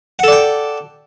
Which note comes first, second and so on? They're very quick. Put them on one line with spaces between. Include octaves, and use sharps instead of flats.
F#5 A4 D5 G5